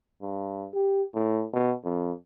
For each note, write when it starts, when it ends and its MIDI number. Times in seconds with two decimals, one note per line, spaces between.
0.22 0.67 43
0.74 1.03 67
1.13 1.45 45
1.53 1.74 47
1.84 2.12 41